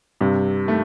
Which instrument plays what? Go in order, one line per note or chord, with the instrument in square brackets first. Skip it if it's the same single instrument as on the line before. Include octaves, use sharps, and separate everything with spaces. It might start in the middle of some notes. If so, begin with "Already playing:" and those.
[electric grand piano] G2 [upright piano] C3
[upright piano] D#3 A3